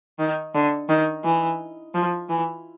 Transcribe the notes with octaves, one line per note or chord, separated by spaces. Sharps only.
D#3
D3
D#3
E3
F3
E3